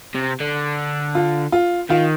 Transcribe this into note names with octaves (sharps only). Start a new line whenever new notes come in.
C3
D3
F4
F4
D#3 F4